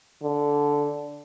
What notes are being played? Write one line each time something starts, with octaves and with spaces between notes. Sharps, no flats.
D3